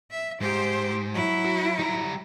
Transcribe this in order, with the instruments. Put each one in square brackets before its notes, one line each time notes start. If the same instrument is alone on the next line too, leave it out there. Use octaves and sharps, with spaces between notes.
[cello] E5
[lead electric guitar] G#2 [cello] G4 C5
[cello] F#3 E4
[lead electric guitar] F#4
G3 A#5